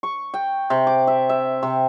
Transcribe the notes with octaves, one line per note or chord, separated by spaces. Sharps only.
C#6
G5
C3
D6
E5
E5
C3